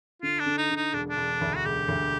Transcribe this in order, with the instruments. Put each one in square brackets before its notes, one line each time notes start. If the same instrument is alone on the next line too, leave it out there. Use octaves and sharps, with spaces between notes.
[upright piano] D3 [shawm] F4
[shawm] D4
[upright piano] D3
[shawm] D#4
[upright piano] D3
[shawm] D#4
[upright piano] E1 [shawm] D4
[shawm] D4
[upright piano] E1
D2
[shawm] F#4
[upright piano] E1 [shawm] G4
[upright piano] D2